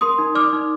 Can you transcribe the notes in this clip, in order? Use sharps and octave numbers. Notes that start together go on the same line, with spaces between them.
A#4 C6 D#6
D#4
D5 D6 F6
D#4